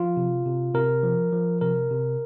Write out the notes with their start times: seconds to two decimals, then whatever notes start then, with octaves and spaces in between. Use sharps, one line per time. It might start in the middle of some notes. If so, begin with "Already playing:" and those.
Already playing: F3 F4
0.17 C3
0.46 C3
0.74 C3 A#4
1.03 F3
1.32 F3
1.61 C3 A#4
1.91 C3